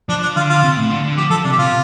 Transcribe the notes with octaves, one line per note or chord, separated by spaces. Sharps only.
F3 D4
D4
D3 F4
F4
C3
A2
D3
D3
F3 G4
F3 A4
C3 D4
G4
C3 F4